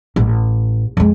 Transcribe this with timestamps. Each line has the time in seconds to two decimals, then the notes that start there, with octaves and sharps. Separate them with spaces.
0.16 A1
0.97 F2 G#3